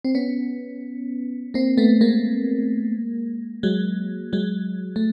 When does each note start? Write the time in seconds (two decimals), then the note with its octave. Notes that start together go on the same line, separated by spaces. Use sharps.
0.05 C4
0.15 B3 C#4
1.54 A#3 C4
1.78 A3 B3
2.01 G#3 A#3
3.63 F#3 G#3
4.33 F#3 G#3
4.96 A3